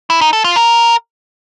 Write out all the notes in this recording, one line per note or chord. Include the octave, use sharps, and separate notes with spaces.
E4
D#4
A4
F4
A#4